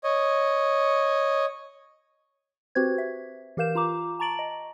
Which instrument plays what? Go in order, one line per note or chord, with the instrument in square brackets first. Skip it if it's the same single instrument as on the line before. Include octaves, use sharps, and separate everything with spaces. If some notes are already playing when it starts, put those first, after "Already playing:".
[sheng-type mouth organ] C#5 D#5
[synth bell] C4 F#4 G4 B4 C5 G#6
E5
E3 G4 A#4 F5 G6 E7
F4 A#5 D6
A5 A#5 C#6 A6 D7 F#7
D#5